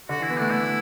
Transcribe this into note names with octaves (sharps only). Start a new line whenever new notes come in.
D3 F#4
E3
E4
B3
A3 D4
D3 E4